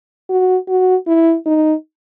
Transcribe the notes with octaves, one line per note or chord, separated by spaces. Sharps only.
F#4
F#4
E4
D#4